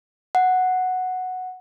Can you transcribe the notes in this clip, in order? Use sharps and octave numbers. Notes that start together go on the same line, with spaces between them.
F#5